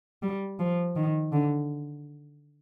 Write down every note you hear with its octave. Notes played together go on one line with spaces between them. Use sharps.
G3
F3
D#3
D3